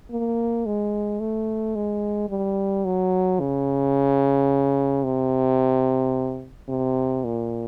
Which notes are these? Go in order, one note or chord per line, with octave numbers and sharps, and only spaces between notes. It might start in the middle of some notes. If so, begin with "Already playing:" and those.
A#3
G#3
A3
G#3
G3
F#3
C#3
C3
C3
A#2